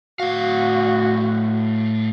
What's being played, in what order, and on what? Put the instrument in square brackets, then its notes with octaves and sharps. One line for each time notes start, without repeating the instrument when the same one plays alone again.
[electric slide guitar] A2 F5 [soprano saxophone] F#4